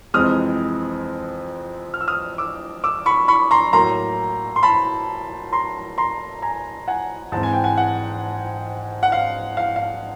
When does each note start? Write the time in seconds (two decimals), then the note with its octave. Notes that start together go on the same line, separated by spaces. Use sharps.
0.14 F2 C3 E3 G#3 C4 D#6 F6
1.94 F6
2.01 E6
2.08 D#6 F6
2.38 D6 E6
2.84 D6 E6
3.06 B5 C#6
3.28 B5 C#6
3.51 A#5 C6
3.73 A2 F#3 A#3 A#5 C6
4.56 C6
4.63 A5 B5
5.52 A#5 C6
5.98 A#5 C6
6.42 G#5 A#5
6.88 F#5 G#5
7.32 G#2 E3 G#3 C4 A5
7.43 G#5
7.54 G5
7.64 F#5 G#5
7.77 F#5
9.03 F#5
9.12 F5
9.57 F5
9.76 F5